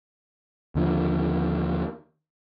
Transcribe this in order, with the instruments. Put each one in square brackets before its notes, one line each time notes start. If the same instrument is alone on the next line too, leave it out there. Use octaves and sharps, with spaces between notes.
[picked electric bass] D#2 D3 F3